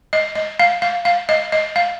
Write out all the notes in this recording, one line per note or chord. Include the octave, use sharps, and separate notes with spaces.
D#5
D#5
F5
F5
F5
D#5
D#5
F5